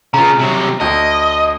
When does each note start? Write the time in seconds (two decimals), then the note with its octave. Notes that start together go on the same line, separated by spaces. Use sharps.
0.14 C#3 F4 A#5
0.39 C3 F#3
0.81 D2 D#5